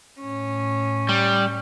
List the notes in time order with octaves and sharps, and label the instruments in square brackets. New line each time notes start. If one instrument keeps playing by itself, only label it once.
[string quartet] A2 C#4
[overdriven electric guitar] G3